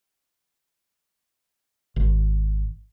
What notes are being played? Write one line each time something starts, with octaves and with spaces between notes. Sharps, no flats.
G#1